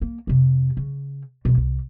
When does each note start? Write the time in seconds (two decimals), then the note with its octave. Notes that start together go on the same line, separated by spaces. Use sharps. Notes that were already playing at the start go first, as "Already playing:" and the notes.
0.02 A#3
0.27 F2 C3
0.77 C#3
1.45 B2 G#3
1.57 C2